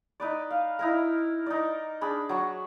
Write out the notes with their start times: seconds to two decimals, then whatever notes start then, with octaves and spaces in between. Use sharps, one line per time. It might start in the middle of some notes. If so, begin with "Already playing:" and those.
0.20 D#4 B4 D5
0.51 F5
0.79 D#4 E4 A#4
1.46 D#4 D5
2.01 D4 G#4 B5
2.29 F#3 C#6